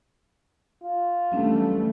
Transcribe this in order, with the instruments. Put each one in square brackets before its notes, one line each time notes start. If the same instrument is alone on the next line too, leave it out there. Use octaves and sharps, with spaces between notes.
[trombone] F4
[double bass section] E3 G3 A3 [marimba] F#3 C#4 D4